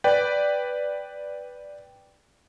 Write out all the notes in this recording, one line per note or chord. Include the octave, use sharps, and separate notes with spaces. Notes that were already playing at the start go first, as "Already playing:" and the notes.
B4 D5 G5